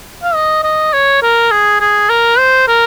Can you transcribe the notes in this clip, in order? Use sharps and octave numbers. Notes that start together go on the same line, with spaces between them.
F5
D#5
D#5
C#5
A#4
G#4
G#4
A#4
C5
A#4